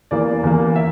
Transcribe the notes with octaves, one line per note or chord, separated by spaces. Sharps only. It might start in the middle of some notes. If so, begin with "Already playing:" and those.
E2 E3 A#3 D5
E2 E3 A#3
E5